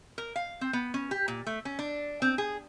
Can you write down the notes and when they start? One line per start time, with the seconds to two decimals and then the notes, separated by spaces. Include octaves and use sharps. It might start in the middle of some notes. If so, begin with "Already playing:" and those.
0.18 A#4
0.36 F5
0.61 C4
0.73 B3
0.94 C#4
1.11 G4
1.28 A#2
1.46 A3
1.65 C#4
1.79 D4
2.22 C4
2.38 G#4